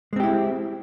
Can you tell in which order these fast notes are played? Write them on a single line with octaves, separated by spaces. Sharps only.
G#3 C4 G4 E4